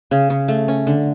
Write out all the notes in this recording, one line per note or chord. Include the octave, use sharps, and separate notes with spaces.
C#3
C#3
A3
C#4
D3